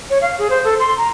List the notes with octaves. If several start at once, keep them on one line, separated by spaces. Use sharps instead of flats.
C#5
F5
G#4
C5
A4
C6
A#5